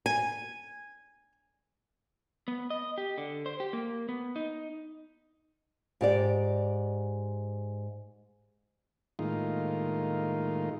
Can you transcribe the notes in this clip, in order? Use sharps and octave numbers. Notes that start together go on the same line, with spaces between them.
G#5
B3
D#5
G4
D3
C5
G4
A#3
B3
D#4
G#2 G4 D5
A2 D#3 G#3 A#3 D#4 F4